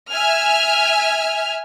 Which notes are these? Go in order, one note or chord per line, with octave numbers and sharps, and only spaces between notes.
E5 G#5 F6